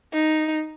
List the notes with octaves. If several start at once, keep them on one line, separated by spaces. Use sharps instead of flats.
D#4